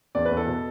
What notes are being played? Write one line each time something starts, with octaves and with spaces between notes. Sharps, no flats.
E2 D5
B4
E2
A4
B2